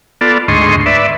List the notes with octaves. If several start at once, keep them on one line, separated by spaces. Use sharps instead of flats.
B3 F4 A4 D5
D2 G#2 D#5 C6 C#6
B4 D5 E5